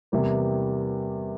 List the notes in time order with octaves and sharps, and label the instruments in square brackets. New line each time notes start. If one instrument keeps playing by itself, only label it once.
[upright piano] E2 C3 E3 G3 A#3